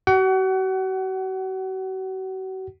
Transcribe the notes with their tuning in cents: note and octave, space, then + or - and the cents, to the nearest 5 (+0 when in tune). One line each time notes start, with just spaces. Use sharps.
F#4 +40 F#5 +30